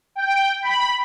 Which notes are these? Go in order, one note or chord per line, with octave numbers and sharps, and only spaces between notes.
G5
B5